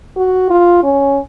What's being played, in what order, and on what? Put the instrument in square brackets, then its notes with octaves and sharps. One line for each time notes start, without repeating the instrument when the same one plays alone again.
[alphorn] F#4
F4
C#4